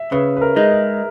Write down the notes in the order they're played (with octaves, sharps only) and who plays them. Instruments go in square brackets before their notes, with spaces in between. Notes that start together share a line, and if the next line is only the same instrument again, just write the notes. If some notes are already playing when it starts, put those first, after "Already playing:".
Already playing: [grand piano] E5
[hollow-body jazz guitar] C#3 [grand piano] B4
[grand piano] B4
A#4
[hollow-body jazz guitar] G#3 D#4
[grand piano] G#4